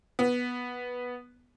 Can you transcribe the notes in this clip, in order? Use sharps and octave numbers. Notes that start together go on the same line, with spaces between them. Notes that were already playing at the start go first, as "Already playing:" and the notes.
B3